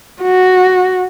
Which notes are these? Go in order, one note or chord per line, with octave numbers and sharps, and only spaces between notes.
F#4